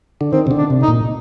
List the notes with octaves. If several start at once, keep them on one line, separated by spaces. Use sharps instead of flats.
D3
D#3 C4
C3
D3
D4
C3
D#4
A#2